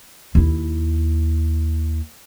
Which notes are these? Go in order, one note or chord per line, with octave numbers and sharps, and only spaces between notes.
D#2 E4